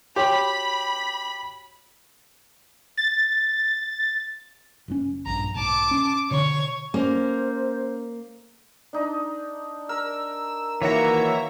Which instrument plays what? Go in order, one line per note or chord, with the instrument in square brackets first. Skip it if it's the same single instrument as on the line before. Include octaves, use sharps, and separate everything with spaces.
[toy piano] F#4 C#5 C#6 [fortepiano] G4 [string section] B5
[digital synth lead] A6
[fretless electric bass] F#1 C3 C#4
[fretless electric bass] A#1 G2 [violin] A#5
[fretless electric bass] F#1 B1 G#2 [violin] A5 D6
[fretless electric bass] C#4
[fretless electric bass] B2 D3 [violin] C#5 C#6
[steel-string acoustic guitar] A#3 [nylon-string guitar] C#4 [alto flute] C5
[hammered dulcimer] D4 D#4
[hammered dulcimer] A#4 [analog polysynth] E6
[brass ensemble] D#3 A#3 [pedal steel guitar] E3 F#4 [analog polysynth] C#5 E5 A#5